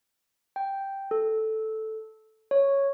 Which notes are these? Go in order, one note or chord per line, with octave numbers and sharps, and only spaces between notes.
G5
A4
C#5